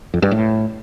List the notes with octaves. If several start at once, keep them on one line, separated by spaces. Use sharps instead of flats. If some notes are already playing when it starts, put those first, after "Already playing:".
F2
G2
A2